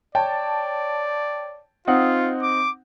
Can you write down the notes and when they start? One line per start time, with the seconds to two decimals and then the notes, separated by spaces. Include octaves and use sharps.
0.15 C#5 D5 G5 A5
1.88 C4 D#4 F4 F#5
2.43 D6